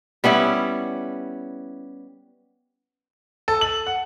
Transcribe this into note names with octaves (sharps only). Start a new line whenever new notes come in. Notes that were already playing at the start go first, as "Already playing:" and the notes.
G3 B3 C#4 E4
A4
F#7
F#5